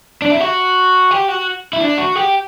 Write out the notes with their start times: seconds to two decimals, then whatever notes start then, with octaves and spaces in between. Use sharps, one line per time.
0.22 D4
0.31 E4
0.40 F#4
1.11 G4
1.28 F#4
1.73 E4
1.81 D4
1.98 F#4
2.15 G4